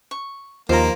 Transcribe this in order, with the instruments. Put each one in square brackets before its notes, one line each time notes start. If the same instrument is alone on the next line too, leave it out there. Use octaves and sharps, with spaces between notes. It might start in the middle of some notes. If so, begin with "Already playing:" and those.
[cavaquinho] C#6
[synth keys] D#2 [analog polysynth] F3 F4 [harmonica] A#3 [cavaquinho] C5 A#5